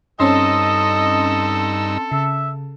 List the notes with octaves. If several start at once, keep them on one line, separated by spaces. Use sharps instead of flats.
G2 C4 C#4 D#4 A4 D#5 C6 E6
C#3 E5